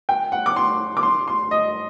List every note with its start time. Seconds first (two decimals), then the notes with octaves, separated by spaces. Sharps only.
0.09 G5
0.32 F#5
0.46 D6
0.56 C6
0.97 D6
1.03 C6
1.28 C6
1.51 D#5